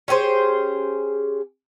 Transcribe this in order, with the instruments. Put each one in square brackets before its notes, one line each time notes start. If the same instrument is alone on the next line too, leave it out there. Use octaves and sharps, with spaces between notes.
[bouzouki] C#4 G4 G#4 C5